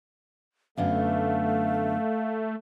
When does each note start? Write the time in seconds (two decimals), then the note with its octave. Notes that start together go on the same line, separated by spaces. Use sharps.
0.77 F#2 D3 A3 B3 F5